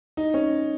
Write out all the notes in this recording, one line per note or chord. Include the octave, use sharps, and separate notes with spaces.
D#4
C#4